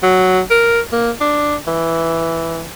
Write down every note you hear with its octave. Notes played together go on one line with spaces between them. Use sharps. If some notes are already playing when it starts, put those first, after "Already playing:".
F#3
A#4
A#3
D4
E3